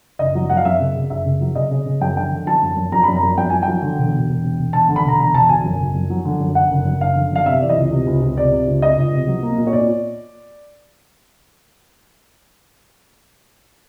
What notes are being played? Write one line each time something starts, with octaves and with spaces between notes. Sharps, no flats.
F#1 D#5
F#3
F#2 F#5
F5
F#2 E5
C#3
C#3
F#1 E5
C#3
F#3
C#3 D#5
C#3
C#3
F#2 G5
D3 G5
D3
F#3 A5
F#2
F#2
F#2 A#5
F#2 B5
A#5
F#2
F#2 G5
F#3 G#5
F#3 G5
D3
E1
E1
E1
E1
E1
E1 A5
D3
B5
E1 A#5
E1 A#5
E1 A5
D2 G#5
F#2
F#1
F#2
F#3
D3
F#2
D3 F#5
F#1
F#2
F#1 F5
D3
F#2 F5
C3 E5
E3 D5
D#5
C#2
C3
C#2
C#2
C3 D5
C3
C#2
C#2 D#5
C#2
C3
F#3
A#3
A#2
C#5
A#2 D5